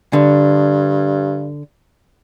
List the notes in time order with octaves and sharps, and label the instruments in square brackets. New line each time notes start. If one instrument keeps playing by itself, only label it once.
[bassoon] G2 [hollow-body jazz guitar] D3